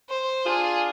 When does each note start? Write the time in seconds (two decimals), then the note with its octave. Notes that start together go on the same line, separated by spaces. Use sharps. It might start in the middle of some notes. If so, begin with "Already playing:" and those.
0.09 C5
0.46 D4 F4 G#4